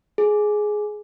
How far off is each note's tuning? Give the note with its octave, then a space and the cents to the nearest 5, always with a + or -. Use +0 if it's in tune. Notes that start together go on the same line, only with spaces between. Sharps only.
G#4 +10